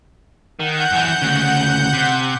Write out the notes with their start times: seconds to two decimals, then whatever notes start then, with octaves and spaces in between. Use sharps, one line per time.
0.59 D#3 F#5 G6
0.92 F#2 E3
1.22 D2 C#3
1.93 C3